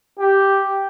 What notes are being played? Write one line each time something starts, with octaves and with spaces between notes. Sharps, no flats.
G4